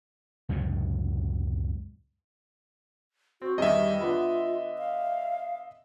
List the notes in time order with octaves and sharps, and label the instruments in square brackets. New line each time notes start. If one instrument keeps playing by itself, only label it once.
[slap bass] C#2 F#2 A2 C3
[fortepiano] C4 [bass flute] F#4
[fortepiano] E2 G2 D#3 [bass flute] G3 [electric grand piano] D#5 E5
[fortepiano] D3 B3 B5 [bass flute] F4
[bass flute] F5